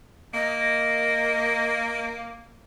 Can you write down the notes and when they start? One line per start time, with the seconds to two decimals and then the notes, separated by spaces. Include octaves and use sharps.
0.34 A#3 D#5